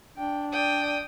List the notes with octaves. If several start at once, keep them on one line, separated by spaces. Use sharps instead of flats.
D4 G5
D5 G5 D#6